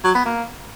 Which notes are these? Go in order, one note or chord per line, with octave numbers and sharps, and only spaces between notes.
F#3
B3
A#3